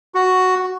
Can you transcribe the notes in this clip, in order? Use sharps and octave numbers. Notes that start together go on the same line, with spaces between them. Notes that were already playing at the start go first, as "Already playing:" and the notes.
F#4